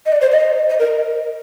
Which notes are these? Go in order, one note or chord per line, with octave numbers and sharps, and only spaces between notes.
D#5
D5
C5
D#5
D#5
A#4